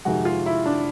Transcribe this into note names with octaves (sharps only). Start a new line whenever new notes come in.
F2 C3 D#3 G#3 F#4
F4
E4
D4